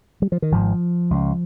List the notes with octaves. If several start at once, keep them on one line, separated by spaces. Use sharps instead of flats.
G3
F3
D#3
G#1 G#2 F3
C#2 C#3